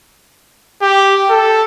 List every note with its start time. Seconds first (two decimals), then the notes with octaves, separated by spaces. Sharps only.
0.81 G4
1.30 A4